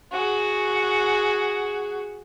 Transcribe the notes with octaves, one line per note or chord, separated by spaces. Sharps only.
F#4 G#4